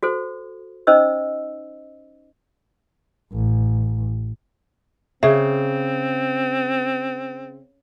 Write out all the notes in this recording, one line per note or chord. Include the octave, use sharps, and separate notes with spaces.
F#4 A4 C5
C#4 D#4 C5 D#5 E6
A1
C#3 C4 G#4 E5